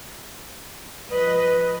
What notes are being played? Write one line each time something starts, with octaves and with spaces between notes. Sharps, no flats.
F3 B4 D#5